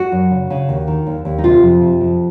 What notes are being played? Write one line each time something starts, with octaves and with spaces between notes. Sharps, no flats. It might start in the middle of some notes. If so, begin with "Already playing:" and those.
Already playing: F#4
F#2
C#3
C#3
D#2
D#3
D#2
D#2
D#4
C3 F4
F2
C3
F2